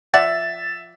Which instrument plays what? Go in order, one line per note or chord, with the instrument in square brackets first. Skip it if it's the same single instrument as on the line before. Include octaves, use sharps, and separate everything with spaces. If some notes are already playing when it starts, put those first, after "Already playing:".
[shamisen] F3 D5 F#5 [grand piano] E5 [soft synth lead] A6